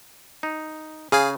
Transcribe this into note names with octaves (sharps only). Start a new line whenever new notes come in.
D#4
C#3 G#4 F5 G#5